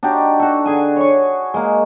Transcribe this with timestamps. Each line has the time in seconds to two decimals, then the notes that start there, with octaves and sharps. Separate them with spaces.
0.03 D4 D#4 F#4 G4
0.40 F#4 A4
0.66 D3 G#4 G#5
0.96 C#5 C#6
1.54 G#3 A#3